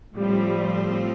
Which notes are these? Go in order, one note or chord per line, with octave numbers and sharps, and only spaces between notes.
A2 F3 G3 A3 C4 F4